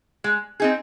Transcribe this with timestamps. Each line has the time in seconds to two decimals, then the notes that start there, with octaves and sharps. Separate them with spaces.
0.24 G#3
0.60 C4 D#4 G#4